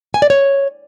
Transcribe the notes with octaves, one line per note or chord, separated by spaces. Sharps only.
G#5
D5
C#5